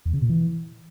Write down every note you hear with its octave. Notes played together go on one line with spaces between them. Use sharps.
E2
C#3
A#2
E3